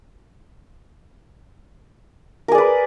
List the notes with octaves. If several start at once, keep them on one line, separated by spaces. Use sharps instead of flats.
G#4 A#4 B4 D5